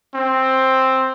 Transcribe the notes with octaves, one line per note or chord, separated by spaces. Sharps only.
C4